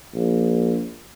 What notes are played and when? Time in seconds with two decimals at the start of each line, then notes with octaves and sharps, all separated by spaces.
0.15 A#1